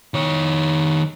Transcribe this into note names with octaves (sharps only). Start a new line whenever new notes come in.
D#3 C#5